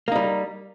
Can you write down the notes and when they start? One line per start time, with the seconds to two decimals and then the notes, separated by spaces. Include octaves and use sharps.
0.08 A#3
0.12 D#4
0.16 G3